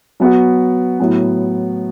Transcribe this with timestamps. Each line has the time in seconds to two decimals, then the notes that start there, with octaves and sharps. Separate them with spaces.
0.20 F#3 B3 F#4
1.00 A2 F#3 B3